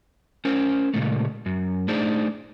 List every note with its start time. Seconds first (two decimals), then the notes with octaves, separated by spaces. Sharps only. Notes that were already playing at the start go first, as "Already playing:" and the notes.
0.45 C#4 A#4 C5
0.94 A#2 C#3 G#3 A3
1.46 F#2
1.88 A3 D4 D#4 G#4 C5